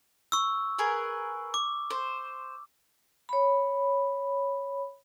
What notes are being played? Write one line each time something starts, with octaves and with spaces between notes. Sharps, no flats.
C#6 E6
G#4 A#4 B4
D6
C5
C#5 B5